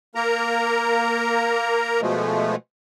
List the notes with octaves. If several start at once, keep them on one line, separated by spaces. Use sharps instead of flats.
A#3 A#4 A#5
B2 F3 G#3 A3